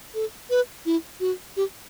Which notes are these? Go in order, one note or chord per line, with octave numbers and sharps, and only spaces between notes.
A4
B4
E4
F#4
G4